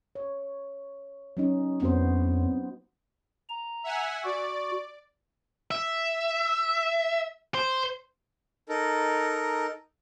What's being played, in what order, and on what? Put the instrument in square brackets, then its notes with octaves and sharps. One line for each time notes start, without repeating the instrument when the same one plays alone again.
[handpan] C#5
F#3 C#4 D#4
[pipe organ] F2 [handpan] B3 F#4 C5
[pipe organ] A#5
[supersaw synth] E5 F#5 G#5
[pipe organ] F#4 [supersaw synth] D5
[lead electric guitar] E5
C5
[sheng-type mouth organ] D#4 A4 A#4